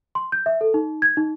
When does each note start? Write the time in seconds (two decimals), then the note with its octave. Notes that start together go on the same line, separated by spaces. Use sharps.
0.15 C6
0.32 G6
0.46 E5
0.61 A4
0.74 D#4
1.02 G#6
1.17 D#4